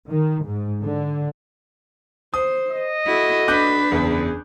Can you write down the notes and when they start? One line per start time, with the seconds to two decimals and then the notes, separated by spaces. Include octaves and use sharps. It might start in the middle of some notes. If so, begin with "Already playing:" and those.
0.11 D#3
0.45 G#2
0.83 D3
2.34 C5 D#6
2.71 D#5
3.06 E4 F#4 A4
3.48 D4 B4 D6 F#6 G6
3.92 F#1 E2 G#4